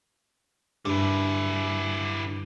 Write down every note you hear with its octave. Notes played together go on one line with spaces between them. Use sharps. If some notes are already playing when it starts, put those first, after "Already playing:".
G2 D3 E4